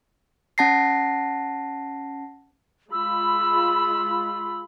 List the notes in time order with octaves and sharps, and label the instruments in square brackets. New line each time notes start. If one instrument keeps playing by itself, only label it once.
[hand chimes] C#4 F#5 A5 A#6 C7
[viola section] G#3 F4 B5 [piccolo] E6